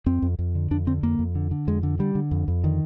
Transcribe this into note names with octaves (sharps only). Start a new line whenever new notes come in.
F2 C4
F2
F2
D3
F2 D4
D3 C4
F2 A#3
F2
D3
D3
F2 G#3
D3
D3 G3
D3
F2
F2
D3 D#3